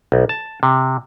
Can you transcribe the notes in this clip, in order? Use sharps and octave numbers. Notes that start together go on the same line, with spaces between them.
B1
A5
C3